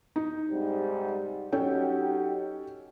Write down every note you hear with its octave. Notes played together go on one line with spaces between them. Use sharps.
D#4
G#2 C3 G3
F#3 C#4 D#4 G4 A4 G5